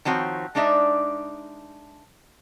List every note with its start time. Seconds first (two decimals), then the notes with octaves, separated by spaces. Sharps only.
0.05 D#3 F3 C4 F#4 C#5
0.55 G#3 D4 D#4 D5 E5